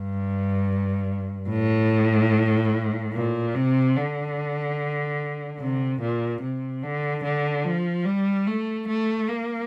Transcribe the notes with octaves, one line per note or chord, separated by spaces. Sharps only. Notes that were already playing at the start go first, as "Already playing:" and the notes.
Already playing: G2
A2
A#2
C3
D3
C3
A#2
C3
D3
D3
F3
G3
A3
A3
A#3